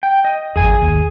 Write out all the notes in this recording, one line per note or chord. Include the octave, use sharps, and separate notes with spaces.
G5
D#5
G#1 F2 G#4 G#5
D#2